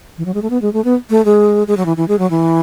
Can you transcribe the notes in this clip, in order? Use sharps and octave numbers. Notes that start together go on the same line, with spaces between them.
E3
F#3
G#3
A3
B3
G#3
A3
B3
A3
G#3
G#3
F#3
E3
E3
G#3
F#3
E3